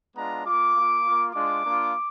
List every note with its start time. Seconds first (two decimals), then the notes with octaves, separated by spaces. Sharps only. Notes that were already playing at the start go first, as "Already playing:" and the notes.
0.14 G#3 B3 D4 F4 A#5
0.45 A#3 F4 D6
0.74 A#3
0.79 F4
1.03 A#3 F4
1.33 G#3 D4 F4 D6
1.63 A#3 D4 F4